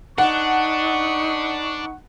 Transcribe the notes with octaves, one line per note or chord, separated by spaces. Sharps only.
D4 D#4 B4 F#5 C#6